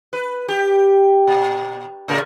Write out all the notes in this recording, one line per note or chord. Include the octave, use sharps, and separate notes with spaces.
B4
G4
A#2
A2 C#3 A#4